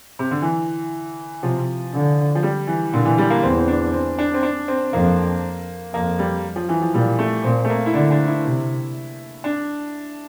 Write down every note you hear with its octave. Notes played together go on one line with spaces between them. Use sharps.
C3
D3
E3
C3 F3
D3
F3
G3
E3
A#2 D3
E3
G3
A#3
E2 C4
C4
D4
C4
D4
C4
D4
C4
F2 A#3
F2 A#3
G3
F3
E3
F3
A#2 G3
A3
A#2 C4
A3
A#3
E4
D3 D4
D4
E4
C3
D4